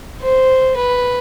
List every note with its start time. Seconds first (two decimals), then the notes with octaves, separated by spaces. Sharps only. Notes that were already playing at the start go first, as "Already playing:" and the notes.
0.22 C5
0.77 B4